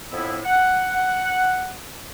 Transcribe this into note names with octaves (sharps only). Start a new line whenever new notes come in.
F2 A2 B3 E4
F#5